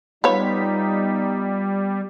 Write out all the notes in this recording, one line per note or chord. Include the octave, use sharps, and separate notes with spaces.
G3 B3 D#4 F4 B4 C#5 B6